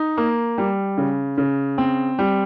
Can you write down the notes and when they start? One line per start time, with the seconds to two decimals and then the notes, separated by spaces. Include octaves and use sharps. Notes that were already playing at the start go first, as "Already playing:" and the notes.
Already playing: D#4
0.17 A#3
0.58 G3
0.98 C#3
1.38 C#3
1.78 C4
2.19 G3